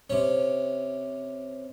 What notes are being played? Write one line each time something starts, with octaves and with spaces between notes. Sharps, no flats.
C3 C#4